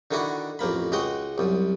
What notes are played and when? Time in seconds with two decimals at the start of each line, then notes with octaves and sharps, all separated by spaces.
0.11 D3 D#3 D4 E4 F#4
0.59 A1 F2 A#3 B5
0.92 C#2 G#3 F#4 G5
1.38 C2 F#2